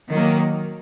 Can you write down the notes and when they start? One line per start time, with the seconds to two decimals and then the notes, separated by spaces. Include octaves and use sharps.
0.08 D#3 F#3 A#3